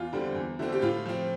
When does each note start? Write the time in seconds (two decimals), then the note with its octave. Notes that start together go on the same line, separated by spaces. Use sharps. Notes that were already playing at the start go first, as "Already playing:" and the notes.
Already playing: E2 F4
0.13 D3 G3 C4
0.35 E2
0.59 D3 A3 C4
0.72 G4
0.81 A2 F4
1.06 F3 C4